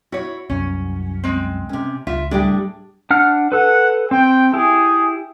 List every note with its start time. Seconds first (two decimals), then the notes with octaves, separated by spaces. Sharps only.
0.12 E4 F#4 C#5
0.50 C2 F#2 C#4
1.24 G#3 C4
1.69 C3 C#4
2.07 C#2 F4 E5
2.31 A2 G3 D4 G4 G#4
3.10 D4 F#5 F6
3.52 A4 B4 F#5
4.11 C4 G5
4.53 E4 G4 G#4